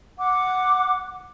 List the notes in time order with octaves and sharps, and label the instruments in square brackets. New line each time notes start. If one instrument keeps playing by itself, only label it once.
[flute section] F#5 D6